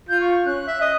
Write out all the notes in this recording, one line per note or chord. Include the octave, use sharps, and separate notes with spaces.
F4 G6
C#6
C#4 F#6
E5
D#5